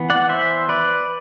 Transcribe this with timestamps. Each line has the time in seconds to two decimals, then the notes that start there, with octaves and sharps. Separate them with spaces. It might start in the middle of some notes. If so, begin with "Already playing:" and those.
Already playing: E3 B3
0.10 D5 F#5
0.29 C5 E5
0.69 B4 D5